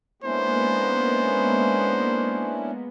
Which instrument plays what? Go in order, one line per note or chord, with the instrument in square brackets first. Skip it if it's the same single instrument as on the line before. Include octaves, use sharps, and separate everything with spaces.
[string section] G#3 A#3 B3 [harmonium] C#4 D4 E4 [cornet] C5